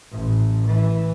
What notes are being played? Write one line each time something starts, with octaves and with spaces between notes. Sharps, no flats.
A1
E3